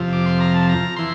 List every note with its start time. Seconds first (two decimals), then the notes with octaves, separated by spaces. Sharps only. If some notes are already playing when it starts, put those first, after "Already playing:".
Already playing: F2 C3 F3
0.13 D6
0.26 C6
0.41 A#5
0.54 A5
0.69 A#5
0.97 E3 C6